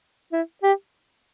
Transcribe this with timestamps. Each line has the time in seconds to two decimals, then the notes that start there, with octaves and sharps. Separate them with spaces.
0.32 E4
0.63 G4